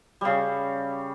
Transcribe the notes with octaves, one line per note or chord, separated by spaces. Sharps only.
C#3 G3